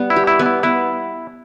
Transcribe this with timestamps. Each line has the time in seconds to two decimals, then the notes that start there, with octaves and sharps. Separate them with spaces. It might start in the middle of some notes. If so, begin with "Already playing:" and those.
Already playing: G3 B3
0.10 E4
0.16 G4
0.27 E4
0.39 B3
0.46 E4
0.63 B3 E4